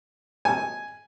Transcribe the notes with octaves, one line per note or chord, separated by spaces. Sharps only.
G#5